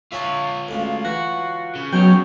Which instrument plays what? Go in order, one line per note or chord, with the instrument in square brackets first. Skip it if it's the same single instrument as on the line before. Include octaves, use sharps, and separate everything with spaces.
[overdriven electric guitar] F4 C#5 [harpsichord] E5 G#5 A5
[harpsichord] D2 G#2 C#3
[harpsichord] E3 [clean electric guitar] F#4
[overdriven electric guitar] C#3
[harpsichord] B2 [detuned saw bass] F#3 [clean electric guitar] C#5 G5